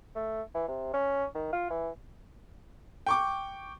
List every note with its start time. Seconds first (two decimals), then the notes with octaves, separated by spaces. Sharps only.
0.15 A3
0.54 E3
0.68 C3
0.94 C#4
1.34 D#3
1.52 F4
1.70 E3
3.07 G5 C#6 D6